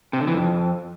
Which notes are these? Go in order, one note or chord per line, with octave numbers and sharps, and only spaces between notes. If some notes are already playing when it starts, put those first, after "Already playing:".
C3
D3
E3
F2